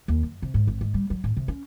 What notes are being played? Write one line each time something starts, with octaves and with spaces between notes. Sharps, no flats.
D#2
F#2
C3
G#2
G#1
G#2
G3
F#3
A2
C3
C#4